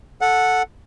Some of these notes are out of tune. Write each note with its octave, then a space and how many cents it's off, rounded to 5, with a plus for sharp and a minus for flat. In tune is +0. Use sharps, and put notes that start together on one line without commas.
A4 +0 F#5 -10